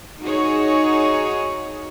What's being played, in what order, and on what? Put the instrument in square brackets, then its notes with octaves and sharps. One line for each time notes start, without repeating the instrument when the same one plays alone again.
[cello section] D#4 F#4 G#4 C#5